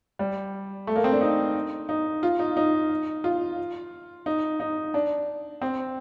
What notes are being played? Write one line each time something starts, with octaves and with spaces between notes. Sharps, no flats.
G3
A3
A#3
C4
D4
D#4
D#4
F4
D#4
D#4
F4
D#4
D#4
D4
C4